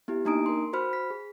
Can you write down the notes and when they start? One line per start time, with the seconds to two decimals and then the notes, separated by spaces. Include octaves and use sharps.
0.08 B3 E4 G4
0.25 A#3 D4 D#4 A#5 D#6 D7
0.46 A#4 C6
0.73 F#4 C5 B5 F6
0.93 B6
1.10 G#4